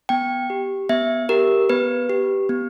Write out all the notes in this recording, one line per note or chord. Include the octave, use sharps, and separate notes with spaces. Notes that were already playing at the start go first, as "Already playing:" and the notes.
B3 G5
G4
B3 E5
G4 A#4
B3 B4
G4
B3